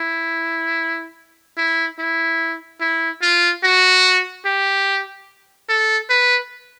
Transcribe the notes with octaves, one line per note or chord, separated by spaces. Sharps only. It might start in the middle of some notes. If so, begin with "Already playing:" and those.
Already playing: E4
E4
E4
E4
F4
F#4
G4
A4
B4